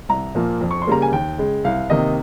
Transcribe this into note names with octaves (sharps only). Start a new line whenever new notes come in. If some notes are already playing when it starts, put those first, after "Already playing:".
C2 A#5
A#2 F3 A#3
F2
C#6
C6
C#3 G3 A#3 A#5
G#5
D#2 G5
C#3 G#3
C2 F5
C3 D#3 A#3 D#5